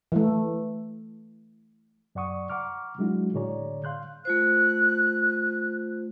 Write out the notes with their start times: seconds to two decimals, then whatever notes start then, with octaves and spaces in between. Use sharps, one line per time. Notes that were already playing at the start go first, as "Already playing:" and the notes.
0.12 E3 A3
2.15 F#2 D5 F#5 C#6 D#6
2.50 F#5 A#5 C#6 D6 F6
2.98 F#3 G#3 D4 E4 F#4
3.34 A2 D3 G#4 C#5 D5 A#5
3.84 F5 C6 F#6 G6
4.25 A3 F4 C5 F#6